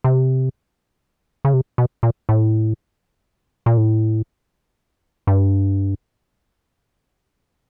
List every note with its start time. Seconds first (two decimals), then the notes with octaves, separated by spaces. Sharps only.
0.04 C3
1.45 C#3
1.53 C3
1.78 B2
2.03 A#2
2.29 A2
3.66 A#2
3.77 A2
5.27 G2